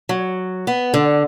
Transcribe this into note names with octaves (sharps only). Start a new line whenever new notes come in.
F#3
B3
D3